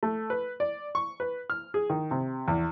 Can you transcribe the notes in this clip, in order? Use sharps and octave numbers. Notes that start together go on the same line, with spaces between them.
A3
B4
D5
C#6
B4
F6
G#4
D#3
C3
E2